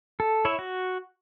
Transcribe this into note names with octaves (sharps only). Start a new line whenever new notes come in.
A4
E4 C#5 E5
F#4